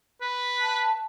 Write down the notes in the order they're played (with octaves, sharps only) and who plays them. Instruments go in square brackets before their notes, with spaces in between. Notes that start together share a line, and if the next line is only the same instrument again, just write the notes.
[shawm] B4
[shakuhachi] A5